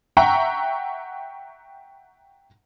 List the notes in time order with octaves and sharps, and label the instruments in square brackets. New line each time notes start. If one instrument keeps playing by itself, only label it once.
[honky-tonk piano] E5 F#5 G5 A#5 C#6